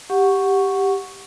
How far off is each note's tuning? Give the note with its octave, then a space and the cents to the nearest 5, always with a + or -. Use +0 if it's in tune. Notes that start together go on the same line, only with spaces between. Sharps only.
G4 +0 F#5 -5 C#6 +0